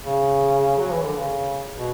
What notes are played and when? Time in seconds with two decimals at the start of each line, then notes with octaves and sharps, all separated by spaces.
0.04 C#3
0.78 F#3
0.92 E3
1.05 D3
1.19 C#3
1.76 B2